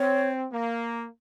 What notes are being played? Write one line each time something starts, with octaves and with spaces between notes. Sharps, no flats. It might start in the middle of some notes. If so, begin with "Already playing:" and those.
Already playing: C4 C#5
A#3